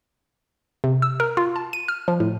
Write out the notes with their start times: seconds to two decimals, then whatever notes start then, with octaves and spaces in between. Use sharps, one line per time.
0.84 C3
1.02 E6
1.20 A#4
1.37 F4
1.56 A5
1.73 D#7
1.88 F6
2.08 F3
2.20 A2